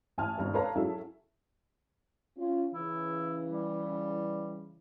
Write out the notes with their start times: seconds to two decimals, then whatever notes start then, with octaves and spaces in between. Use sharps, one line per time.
0.18 A1 G#5 A5 F6
0.37 G#1 G2 B2
0.54 A4 B4 C#5 F5 A5 A#5
0.76 F#3 C#4 E4 G#4 A4 E5
2.37 C#4 F4
2.74 C#3 E3 E4
3.48 G3